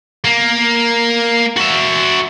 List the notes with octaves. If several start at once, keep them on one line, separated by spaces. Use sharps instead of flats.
A#3
F#4 E5